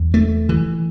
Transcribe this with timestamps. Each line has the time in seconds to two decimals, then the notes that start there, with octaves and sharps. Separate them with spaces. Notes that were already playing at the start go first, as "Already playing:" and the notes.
Already playing: E2
0.14 A3
0.49 E3